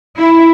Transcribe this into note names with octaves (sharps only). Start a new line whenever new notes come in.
E4